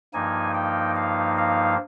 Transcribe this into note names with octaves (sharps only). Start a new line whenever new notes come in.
G2 F3 A#3 D#4 G#5
G5
F5
F5